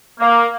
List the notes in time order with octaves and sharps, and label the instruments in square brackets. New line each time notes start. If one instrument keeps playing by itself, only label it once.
[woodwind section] A#3